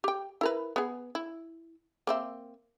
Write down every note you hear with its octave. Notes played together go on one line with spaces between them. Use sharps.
G4 G5
E4 A#4 B4
B3 G#4
E4
A#3 C4 E5